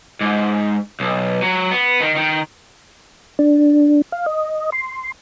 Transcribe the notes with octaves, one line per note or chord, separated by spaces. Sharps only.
G#2
B1
F#3
B3
D#3
D#3
D4
F5
D#5
C6